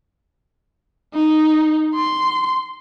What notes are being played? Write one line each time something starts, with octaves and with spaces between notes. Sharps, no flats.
D#4
C6